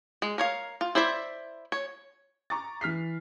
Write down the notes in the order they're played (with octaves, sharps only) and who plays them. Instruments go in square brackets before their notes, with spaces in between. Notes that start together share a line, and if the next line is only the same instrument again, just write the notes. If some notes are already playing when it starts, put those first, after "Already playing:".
[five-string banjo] G#3
A#4 C#5 F5
F4
E4 C5 D5 E5
C#5
[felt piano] A#5 C#6 D6 A6
E3 F6 B6 C7